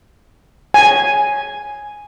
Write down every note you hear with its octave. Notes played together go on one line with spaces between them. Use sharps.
G#5